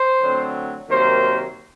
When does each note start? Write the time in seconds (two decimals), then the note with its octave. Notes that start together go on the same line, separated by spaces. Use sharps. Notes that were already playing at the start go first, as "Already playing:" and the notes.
Already playing: C5
0.21 D3 F#3 A3 C4
0.89 C3 D#3 F#3 A#3 C5